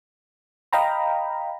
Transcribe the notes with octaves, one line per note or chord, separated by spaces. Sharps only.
D#5 F5 G5 A#5 B5